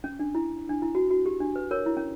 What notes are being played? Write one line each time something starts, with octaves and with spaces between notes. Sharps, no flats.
C#4
D4
E4
D4
E4
F#4
F#4
G4
D4
B4
A#4 C#5
E4
C#4